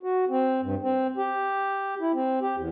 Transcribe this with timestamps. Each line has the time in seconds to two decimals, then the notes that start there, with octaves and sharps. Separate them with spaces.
0.03 F#4
0.29 C4
0.62 G2
0.82 C4
1.17 G4
2.01 E4
2.14 C4
2.41 G4
2.57 E2